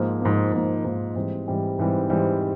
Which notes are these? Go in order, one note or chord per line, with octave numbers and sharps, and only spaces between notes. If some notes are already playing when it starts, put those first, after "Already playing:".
Already playing: G#2 F3 A#3
G#2 F3 A#3
G#2 F3 A#3
G#2 F3 A#3
G#2 E3 G3 C4
G#2 E3 G3 C4
G#2 E3 G3 C4
G#2 E3 G3 C4